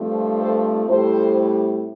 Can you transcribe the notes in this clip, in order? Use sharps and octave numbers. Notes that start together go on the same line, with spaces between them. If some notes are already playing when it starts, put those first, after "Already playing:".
Already playing: G2 F3 A3 C4
A4 C5
A2 G3 C4 A4 C5